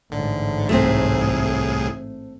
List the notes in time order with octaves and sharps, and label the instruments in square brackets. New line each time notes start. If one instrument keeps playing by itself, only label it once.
[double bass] A1 G#2 [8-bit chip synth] D3
[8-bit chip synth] C2 A2 G#4 [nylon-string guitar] A3 C4